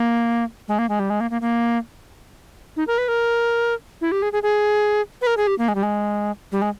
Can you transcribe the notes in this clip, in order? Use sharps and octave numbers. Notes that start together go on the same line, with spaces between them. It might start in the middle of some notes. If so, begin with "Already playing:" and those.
Already playing: A#3
G#3
A#3
G#3
G3
G#3
A#3
A#3
A#3
D#4
A#4
B4
A#4
E4
G4
G#4
G#4
G#4
B4
A#4
G#4
G4
A#3
G#3
G3
G#3
G3
G#3